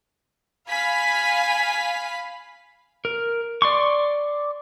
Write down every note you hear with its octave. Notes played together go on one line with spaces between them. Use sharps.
F5 G#5 B5 B6
A#4
D5 C6 C#6